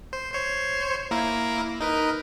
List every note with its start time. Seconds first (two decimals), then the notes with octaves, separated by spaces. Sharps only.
0.13 C5
0.34 C5 C#5
1.11 A#3 E4 A#4
1.81 D#4 A#4 B4